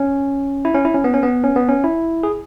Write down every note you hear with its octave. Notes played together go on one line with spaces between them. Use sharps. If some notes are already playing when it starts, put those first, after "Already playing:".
Already playing: C#4
E4
C#4
E4
C#4
B3
C#4
B3
C#4
B3
C#4
E4
G#4